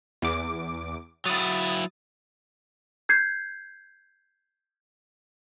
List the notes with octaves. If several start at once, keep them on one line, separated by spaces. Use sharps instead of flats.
E2 D6
F#3 E4 D#6 A6
G6 G#6 C7